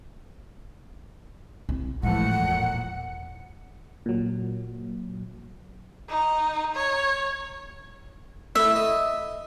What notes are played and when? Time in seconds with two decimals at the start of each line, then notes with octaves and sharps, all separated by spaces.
1.69 B1 D#3 C4 E4
2.03 A2 E3 F3 G#3 A3 F#5
2.42 E1 A#2
4.06 A#2 F#3
6.10 D#4
6.75 C#5
8.55 A3 E4 E5
8.76 D#5